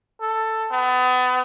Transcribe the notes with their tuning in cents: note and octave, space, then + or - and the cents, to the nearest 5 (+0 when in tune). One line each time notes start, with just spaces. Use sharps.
A4 +10
B3 +30